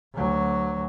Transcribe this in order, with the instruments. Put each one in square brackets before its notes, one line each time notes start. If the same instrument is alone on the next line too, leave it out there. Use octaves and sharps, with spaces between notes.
[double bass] D2 F#3